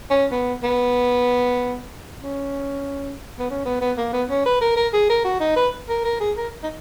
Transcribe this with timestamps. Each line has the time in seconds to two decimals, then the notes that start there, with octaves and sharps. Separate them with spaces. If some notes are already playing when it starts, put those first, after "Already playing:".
0.10 C#4
0.32 B3
0.64 B3
2.23 C#4
3.39 B3
3.50 C#4
3.65 B3
3.81 B3
3.98 A#3
4.13 B3
4.30 C#4
4.46 B4
4.61 A#4
4.77 A#4
4.93 G#4
5.09 A#4
5.24 F#4
5.40 D#4
5.56 B4
5.89 A#4
6.04 A#4
6.20 G#4
6.37 A#4
6.63 D#4